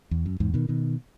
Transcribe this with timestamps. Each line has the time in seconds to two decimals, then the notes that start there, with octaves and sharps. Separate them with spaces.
0.11 E2
0.26 F#2
0.40 E2 G#2
0.54 B2 D#3
0.69 B2 D#3